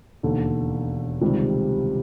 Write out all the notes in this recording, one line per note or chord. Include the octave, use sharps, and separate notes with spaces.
E1 D#2 D3
C#2 C3 D#3 G3